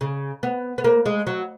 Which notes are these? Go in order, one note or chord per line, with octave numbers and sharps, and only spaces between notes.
C#3
B3
B3
A#3
G#3
F#3